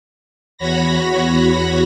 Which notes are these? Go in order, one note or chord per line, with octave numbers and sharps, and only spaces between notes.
E2 F#4 C#5 B5 A#6